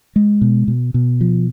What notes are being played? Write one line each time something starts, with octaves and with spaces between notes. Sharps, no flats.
G#3
B2
B2
B2
F3